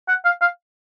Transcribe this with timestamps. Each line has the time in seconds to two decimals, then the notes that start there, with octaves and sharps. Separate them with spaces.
0.09 F#5
0.25 F5
0.41 F5